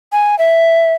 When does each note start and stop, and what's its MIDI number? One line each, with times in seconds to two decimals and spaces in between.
0.12 0.38 80
0.39 0.94 76